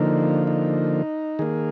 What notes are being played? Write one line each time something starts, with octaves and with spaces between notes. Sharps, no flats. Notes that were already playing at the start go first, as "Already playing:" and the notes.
Already playing: D3 F3 A#3 D#4
D#4
D#3 A#3 G#4